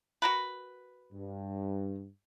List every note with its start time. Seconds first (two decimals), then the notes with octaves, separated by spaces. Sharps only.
0.22 F#4 A#4 B4
1.12 G2